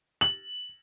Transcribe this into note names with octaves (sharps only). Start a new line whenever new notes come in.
F#7